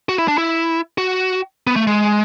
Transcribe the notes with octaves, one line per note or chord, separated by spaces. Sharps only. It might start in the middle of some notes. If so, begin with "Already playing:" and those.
F#4
E4
D4
E4
F#4
B3
A3
G#3